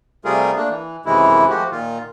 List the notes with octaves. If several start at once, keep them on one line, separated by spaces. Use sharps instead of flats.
C3 G3 A3 F4 G#4 A#4
A3 A#3 D4
E3
F#2 C3 D#3 E3 G#3 E4
F3 G#3 A3 F#4 G4
A#2 D#3 F4